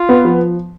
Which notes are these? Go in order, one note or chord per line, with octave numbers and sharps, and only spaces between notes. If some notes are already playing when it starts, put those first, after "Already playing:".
Already playing: F4
B3
F3